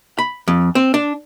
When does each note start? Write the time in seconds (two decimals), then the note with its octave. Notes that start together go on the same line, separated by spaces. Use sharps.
0.19 B5
0.48 F2
0.75 C4
0.94 D4